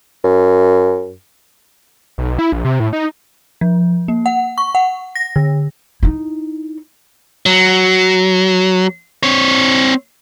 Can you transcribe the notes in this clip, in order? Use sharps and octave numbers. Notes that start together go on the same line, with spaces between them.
F#2
B1
E4
A#1
C3
A2
D#4
F3
A#3
F#5
C#6
F#5
A#6
D3
D#4 E4
F#3
C4 C#5